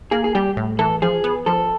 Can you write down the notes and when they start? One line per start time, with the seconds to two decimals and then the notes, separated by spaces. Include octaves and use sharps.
0.11 A#3 G#4
0.24 G#4
0.35 G3 G4
0.57 A2
0.79 E3 A4
1.02 F3 G#4
1.24 B3
1.46 F3 A4